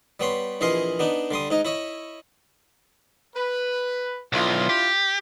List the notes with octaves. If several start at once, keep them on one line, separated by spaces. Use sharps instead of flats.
G3 B3 C#5 C6
A#1 E3 G#4 D#5 F5 C6
B3 D4 D#4
D3 G3 C6 D#6
G#2 D#4 D#5
E4 C#5 D#5
B4
B1 D4 E4 F4
G4